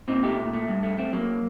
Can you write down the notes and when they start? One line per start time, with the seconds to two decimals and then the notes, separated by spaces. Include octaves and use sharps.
0.08 A#2 C4 D#4
0.23 A3 D#4 G4
0.38 A#2
0.53 A3
0.68 G2
0.83 A3
0.98 A3 C4
1.13 F#3 A#3